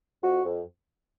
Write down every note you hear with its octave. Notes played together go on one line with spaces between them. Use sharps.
F2 F#4
F2